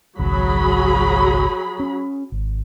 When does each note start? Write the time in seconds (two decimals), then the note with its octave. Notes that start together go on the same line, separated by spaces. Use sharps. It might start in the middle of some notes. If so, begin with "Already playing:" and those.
0.19 G#1 C#2 F#3 G#4 B5
1.80 C#4
2.32 G#1